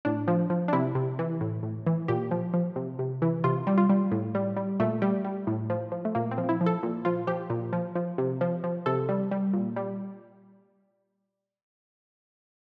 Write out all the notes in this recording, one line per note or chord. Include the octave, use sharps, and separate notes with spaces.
A2 D4
F3
F3
D4
C3 E4
C3
E3
A2
A2
E3
A#2 G4
F3
F3
C3
C3
E3
C3 F4
G3
F4
G3
A2
G3
G3
A#2 A3
G3
G3
A2
F3
F3
A3
A#2 A#3
C4
F3
E4
F3
A4
A#2
F3 F4
F3 G4
A#2
F3
F3
C3
F3
F3
C3 A4
G3
G3
A#2
G3